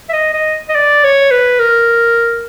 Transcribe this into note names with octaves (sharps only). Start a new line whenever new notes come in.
E5
D#5
D#5
D#5
D5
C#5
B4
A#4